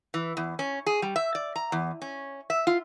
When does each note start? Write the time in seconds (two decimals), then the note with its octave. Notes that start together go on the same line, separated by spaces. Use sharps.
0.14 E3
0.37 E2
0.59 C#4
0.86 G#4
1.02 G3
1.16 E5
1.35 D5
1.56 A#5
1.72 E2
2.02 C#4
2.50 E5
2.67 F4